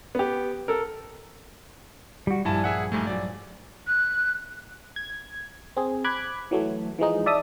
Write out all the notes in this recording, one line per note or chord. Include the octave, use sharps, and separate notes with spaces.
B3 G4
A4 A#4
G3 F#4
A#1 G2 G3 E4 G#5 A5
G#4 E5 F#5
G#2 G3 A3
F#3 D5
F#6
G#6
C4 G#4
B5 D6 F#6 G#6
E3 F#3 A3
E3 F3 G#3 D#4
D5 E5 A5 D#6